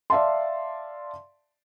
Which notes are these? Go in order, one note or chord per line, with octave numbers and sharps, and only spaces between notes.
D5 E5 F5 A5 C6